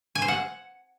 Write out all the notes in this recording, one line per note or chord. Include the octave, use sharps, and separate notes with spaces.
G#5
C5
F#5